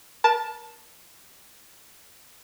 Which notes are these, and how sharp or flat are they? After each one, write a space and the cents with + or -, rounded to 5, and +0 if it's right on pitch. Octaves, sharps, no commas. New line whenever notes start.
A#4 +35 A5 +0